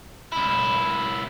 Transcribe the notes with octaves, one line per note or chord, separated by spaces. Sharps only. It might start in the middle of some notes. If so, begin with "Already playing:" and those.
C#2 E4